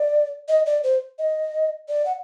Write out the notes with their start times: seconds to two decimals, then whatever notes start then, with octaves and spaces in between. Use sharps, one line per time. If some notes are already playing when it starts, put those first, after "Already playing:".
Already playing: D5
0.48 D#5
0.66 D5
0.84 C5
1.19 D#5
1.89 D5
2.06 F#5